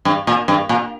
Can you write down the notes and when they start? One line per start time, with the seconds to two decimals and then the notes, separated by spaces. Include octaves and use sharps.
0.05 G2
0.27 A#2
0.48 G2
0.69 A#2